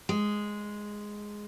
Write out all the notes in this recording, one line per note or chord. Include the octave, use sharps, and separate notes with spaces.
G#3